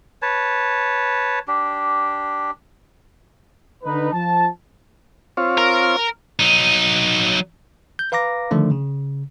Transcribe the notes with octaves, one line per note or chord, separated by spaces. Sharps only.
B4 C#5 A5
D4 G4
D3 D#4 B4
F3 A5
C4 F4 C#5
A#4
F#3 D#4
G6
B4 F5 A#5 D6 A#6
D3 D#3 F3 A3 D4
C#3